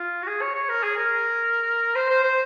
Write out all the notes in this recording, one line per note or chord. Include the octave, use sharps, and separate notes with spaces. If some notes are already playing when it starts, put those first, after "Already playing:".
Already playing: F4
F#4
G#4
C#5
C#5
A#4
G#4
A#4
C5
C5
C5